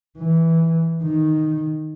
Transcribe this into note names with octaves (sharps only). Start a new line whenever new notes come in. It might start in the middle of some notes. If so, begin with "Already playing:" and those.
E3
D#3